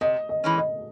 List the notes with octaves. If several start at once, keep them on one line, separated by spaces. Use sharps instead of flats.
C3 D#5
D#5
E3 G#3 C#4
D#5